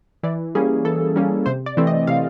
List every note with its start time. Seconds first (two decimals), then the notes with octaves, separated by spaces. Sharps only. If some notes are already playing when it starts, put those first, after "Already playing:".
0.23 E3 D5
0.55 G3 A#3 C#4 G#4
0.85 E3 A4
1.16 G3 A#3 C#4
1.46 C3 C5
1.66 D5
1.77 E3 A3 C4
1.87 D#5
2.07 C3 F5